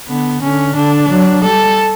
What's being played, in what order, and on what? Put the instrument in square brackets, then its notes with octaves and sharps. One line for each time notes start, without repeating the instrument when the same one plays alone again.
[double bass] D3 [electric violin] B3
[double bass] D3 [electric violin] C#4
[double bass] D3 [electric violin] D4
[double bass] F#3
[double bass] G3 [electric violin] A4